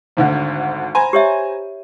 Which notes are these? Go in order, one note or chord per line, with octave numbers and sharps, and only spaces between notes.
G#1 D2 D3
C5 G#5 A#5 B5
G4 C#5 E5